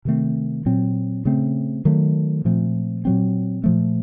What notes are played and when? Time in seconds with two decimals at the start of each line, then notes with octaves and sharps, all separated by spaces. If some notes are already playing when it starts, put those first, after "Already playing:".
0.05 C3 D#3 A3 C4
0.66 A#2 F#3 C4
1.25 C#3 A3 C4
1.85 D#3 F#3 A3
2.45 A#2 F3 A3 C4
3.05 A#2 F#3 C4
3.64 A#2 F3 A3